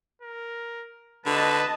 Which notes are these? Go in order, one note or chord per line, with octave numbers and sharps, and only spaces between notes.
A#4
D3 B4 D#5 A5